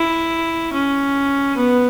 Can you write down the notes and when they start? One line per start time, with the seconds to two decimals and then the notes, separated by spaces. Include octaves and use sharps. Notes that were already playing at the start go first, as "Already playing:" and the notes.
Already playing: E4
0.73 C#4
1.56 B3